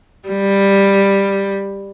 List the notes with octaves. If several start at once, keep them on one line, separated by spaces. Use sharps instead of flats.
G3